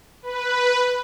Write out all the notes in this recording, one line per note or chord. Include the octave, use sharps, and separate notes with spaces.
B4